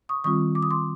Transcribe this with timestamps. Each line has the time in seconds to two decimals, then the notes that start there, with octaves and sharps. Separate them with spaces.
0.09 C#6 D#6
0.24 D#3 G3 C4 F4 C#6 D#6
0.55 D6
0.63 D#6
0.70 C6 D6